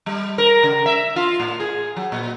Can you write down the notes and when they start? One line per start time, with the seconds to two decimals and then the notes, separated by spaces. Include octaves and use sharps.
0.06 G3
0.38 A#4
0.63 C#3
0.86 E5
1.16 F4
1.40 A2
1.60 G#4
1.96 F#3
2.12 A#2